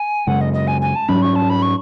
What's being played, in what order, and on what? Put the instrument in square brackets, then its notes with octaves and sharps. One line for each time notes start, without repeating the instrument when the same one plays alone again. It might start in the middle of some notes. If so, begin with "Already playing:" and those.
Already playing: [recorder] G#5
[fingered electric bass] F#2 C#3 G#3 [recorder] F#5
[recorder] D#5
D#5
G#5
G#5
A5
[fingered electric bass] G#2 F#3 C#4 [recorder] B5
[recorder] C#6
A5
B5
C#6